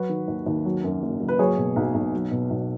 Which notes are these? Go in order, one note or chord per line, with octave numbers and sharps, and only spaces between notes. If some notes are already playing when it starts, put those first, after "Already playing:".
Already playing: F#3 F#4 B4
D#3
D#2
D#2
F#3
F#2
F#1
F#1
B4
F#3 G#4 C#5
B2
B1
B1
F#3
B2
B1